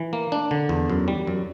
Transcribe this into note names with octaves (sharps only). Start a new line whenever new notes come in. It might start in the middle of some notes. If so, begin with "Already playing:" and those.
Already playing: E3
A#3
D4
D3
E2
F#2
G3
F#2